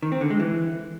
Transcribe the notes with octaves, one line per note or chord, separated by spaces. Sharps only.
D#3
C4
D3
G#3
E3